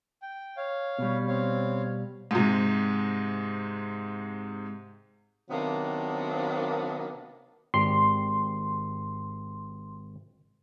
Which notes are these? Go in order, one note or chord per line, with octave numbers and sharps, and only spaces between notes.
G5
C#5 F5
B2 G3
C4 C#5 F5
G#2 C3
C3 D#3 F#3 A#3 B3 D4
G#1 G4 D5 C6